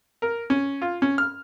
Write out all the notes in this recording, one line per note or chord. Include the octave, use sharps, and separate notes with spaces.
A#4
C#4
F4
C#4
F6